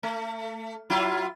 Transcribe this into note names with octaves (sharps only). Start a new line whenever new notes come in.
A3
F#3 E4 F4